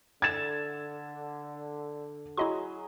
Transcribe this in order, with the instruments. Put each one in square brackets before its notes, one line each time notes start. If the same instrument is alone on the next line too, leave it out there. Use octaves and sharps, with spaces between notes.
[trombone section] D3 [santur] E5 [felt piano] G#6 A6 E7
[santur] F#3 G#4 [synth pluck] E4 D#5 C6